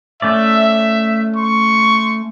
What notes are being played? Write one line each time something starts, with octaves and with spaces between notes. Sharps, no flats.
A3 C#4 D5 E5
C6 C#6